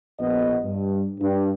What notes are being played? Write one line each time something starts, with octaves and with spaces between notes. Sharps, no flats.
A#1 B3 D#5
G2
G2